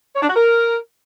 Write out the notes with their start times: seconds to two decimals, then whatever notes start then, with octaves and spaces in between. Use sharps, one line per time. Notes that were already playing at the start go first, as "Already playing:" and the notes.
0.15 C#5
0.22 D4
0.29 F#4
0.36 A#4